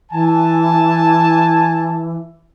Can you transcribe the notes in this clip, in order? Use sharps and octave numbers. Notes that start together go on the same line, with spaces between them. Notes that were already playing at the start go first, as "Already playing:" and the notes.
E3 G#5 A5